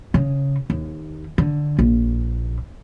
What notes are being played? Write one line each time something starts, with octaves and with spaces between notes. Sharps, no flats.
C#3
D#2
D3
A#1